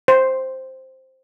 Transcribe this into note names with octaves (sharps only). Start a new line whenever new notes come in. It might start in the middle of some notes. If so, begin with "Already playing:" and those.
C5